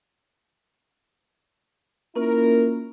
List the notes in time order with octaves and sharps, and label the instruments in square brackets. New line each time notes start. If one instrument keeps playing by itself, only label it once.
[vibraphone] A#3 C#4 F4 [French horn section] E4 A#4